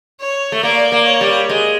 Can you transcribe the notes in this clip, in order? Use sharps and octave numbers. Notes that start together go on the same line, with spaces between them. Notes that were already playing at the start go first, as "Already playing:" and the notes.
C#5
A3
A#3 D5
A#3
C#5
G3
G#3